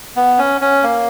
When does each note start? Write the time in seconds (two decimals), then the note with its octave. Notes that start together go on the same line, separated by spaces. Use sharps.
0.16 B3
0.39 C#4
0.61 C#4
0.83 A#3